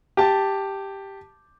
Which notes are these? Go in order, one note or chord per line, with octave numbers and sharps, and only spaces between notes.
G4 A5 D6